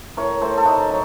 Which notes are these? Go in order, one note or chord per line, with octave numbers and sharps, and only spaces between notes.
A2 A#4 C#5
A2 A4 C5
A4
A2 D#4 F#4
F#3